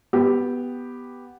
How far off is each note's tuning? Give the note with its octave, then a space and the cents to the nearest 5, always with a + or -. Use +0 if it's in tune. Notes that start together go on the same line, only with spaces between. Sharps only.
B3 +0 G4 +0